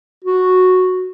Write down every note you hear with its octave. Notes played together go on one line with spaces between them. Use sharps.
F#4